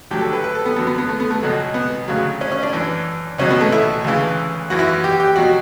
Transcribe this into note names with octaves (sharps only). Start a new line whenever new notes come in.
D2 D3 F#3 G4
A4
B4
B4
A4
B3
F#2 D3 F#3 B3
B3
B3
A3
B3
A3
C#2 B2 F#3
B3
D2 C#3 F#3
C#4
C#4
D4
F#2 E3
C#2 B2 F#3 C#4
B3
A3
E4
D2 C#3 E3
F#2 E3 F#4
E4
F#4
G4
G4
B2 F#3 F#4